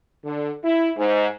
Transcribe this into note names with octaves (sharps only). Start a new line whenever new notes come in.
D3
E4
G#2